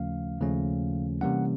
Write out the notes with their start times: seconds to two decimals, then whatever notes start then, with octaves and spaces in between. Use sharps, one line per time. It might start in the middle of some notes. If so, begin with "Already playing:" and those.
Already playing: D#2 C#3 F3 A3 C#4 F5
0.41 D#2 C#3 F3 A3 C#4
1.21 C3 E3 G3 A#3 C#4 F#5